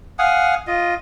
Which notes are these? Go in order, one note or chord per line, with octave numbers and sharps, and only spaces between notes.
F5 F#5 G#5 D#6
F4 D#5